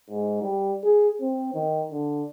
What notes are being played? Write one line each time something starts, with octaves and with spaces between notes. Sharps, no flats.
G#2
G3
G#4
C4
D#3
D3